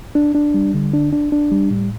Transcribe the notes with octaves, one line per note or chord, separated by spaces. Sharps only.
D4
D4
G3
D3
D4
D4
D4
G3
A2